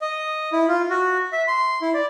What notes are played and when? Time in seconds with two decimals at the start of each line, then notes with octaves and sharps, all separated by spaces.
0.02 D#5
0.52 E4
0.68 F4
0.90 F#4
1.32 E5
1.48 C6
1.82 E4
1.94 D5